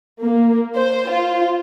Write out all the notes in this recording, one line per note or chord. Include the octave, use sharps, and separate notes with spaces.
A#3
C5
F4